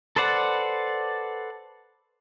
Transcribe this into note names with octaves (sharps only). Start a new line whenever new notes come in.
A4 B4 C5 D5 F#5